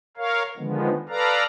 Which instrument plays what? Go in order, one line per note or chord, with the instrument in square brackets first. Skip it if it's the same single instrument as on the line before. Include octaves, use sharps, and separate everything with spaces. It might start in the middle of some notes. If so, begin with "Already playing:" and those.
[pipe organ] A#4 C#5 F5
D3 D#3 F3 G#3 B3
A4 B4 D5 F5 A#5